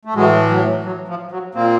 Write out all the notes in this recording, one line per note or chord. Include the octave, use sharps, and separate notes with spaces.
A3
A2 E3 F#3 G#3
F#3
F#3
F3
F#3
A#2 A#3 C4